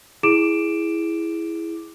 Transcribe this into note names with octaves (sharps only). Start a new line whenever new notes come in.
E4 G#4 D6 D7 E7